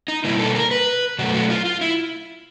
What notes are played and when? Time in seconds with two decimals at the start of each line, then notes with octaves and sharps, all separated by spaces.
0.08 D#4
0.24 B2 G3 A#3 E4
0.39 A4
0.55 A#4
0.71 B4
1.18 B2 F#3 A3 F#4
1.35 F#4
1.50 F4
1.65 F4
1.81 E4